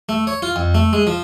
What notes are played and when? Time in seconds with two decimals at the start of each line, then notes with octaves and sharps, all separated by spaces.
0.09 A3
0.27 C#5
0.42 F4
0.56 F2
0.75 A3
0.93 G#3
1.07 F3